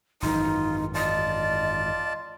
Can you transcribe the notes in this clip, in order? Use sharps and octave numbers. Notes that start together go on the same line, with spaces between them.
G#1 F#2 E3 D#4 F4
F4 D5 D#5 A5